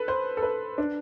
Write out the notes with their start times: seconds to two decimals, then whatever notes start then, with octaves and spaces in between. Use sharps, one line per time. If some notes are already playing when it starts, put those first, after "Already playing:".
Already playing: A4 B4
0.08 C5
0.37 A4
0.43 B4
0.78 D4